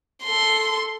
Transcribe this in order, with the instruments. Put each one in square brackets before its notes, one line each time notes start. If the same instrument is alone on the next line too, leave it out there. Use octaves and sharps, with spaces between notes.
[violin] A4 C6